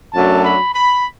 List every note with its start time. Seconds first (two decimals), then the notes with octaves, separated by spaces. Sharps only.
0.13 F#2 F#3 A3 D4 A5
0.43 B5
0.73 B5